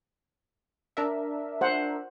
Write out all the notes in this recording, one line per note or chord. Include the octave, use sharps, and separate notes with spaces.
D4 A#4 E5
C5 F#5